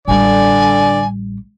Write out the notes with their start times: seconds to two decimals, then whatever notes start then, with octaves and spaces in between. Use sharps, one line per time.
0.08 A1 D3 G3 D5 G#5